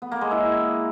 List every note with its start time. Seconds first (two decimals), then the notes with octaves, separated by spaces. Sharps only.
0.02 B3
0.12 A#3
0.21 G#3
0.31 E4